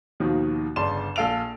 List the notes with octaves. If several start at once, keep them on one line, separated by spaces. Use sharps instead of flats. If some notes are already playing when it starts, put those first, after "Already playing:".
D#2 B2 D#3 F3
G1 C#3 D5 A5 C6 E7
A#1 A4 F5 D7 F7